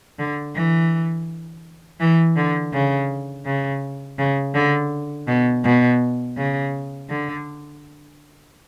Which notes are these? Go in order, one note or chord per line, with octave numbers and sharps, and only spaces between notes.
D3
E3
E3
D3
C#3
C#3
C#3
D3
B2
B2
C#3
D3